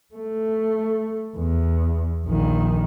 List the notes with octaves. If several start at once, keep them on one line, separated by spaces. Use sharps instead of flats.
A3
E2
A#1 D#3